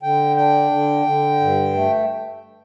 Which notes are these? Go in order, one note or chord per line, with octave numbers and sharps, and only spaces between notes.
D3 G5
D4 G5
D3
D3
G2
A3